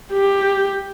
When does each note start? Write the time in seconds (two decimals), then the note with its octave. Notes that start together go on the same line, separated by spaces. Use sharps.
0.13 G4